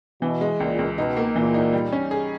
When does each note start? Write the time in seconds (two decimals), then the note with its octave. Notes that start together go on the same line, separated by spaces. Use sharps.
0.22 B2 E3
0.41 G#3
0.60 C#2 A#2
0.79 C#2
0.97 B2 D#4
1.17 A#3
1.36 A#2 E3
1.54 D#4
1.73 G3
1.93 C#4
2.11 G#4